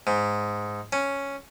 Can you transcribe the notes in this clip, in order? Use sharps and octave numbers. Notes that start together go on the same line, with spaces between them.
G#2
C#4